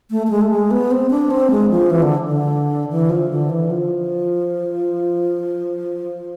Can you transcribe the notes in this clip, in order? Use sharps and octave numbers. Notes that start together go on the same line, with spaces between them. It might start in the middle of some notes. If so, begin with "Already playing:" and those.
A3
A3
G#3
A3
G#3
B3
C4
D4
C4
G#3
F3
E3
D3
D3
E3
F3
D3
E3
F3